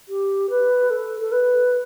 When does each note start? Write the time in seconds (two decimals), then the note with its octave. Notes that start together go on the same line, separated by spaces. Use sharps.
0.08 G4
0.50 B4
0.90 A4
1.20 A4
1.32 B4